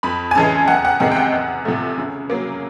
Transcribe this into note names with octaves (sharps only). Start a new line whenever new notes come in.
F2 B5
G#5
C#3 E3 G#3 A5
E2 F#5
F#5
C3 D#3 G#3 F#5
G5
F#5
E2
C3 F3 A3
C#3
F#3 A#3